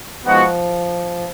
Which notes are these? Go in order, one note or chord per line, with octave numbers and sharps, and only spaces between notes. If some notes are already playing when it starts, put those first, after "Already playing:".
F3 G#3 B3 D#4 F#4